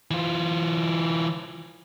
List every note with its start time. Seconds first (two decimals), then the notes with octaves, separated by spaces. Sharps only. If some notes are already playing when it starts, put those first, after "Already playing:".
0.11 E3 F4